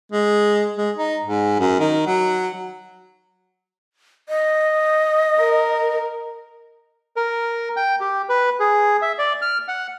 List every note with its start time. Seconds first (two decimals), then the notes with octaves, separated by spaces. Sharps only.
0.12 G#3
0.77 G#3
0.97 D#4
1.24 G#2
1.59 F#2
1.79 D#3
2.06 F#3
4.29 D#5
5.38 A#4
7.16 A#4
7.76 G5
8.00 G4
8.29 B4
8.60 G#4
9.02 E5
9.19 D5
9.42 F6
9.68 F#5